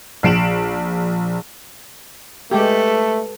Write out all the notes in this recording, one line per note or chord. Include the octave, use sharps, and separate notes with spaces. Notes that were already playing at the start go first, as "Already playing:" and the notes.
A#1 C7 D7 E7 F#7
G#3 A3 G4 A4 B4